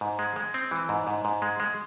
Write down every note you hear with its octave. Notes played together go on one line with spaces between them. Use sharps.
G#2
G#3
G#3
C4
E3
G#2
G#2
G#2
G#3
G#3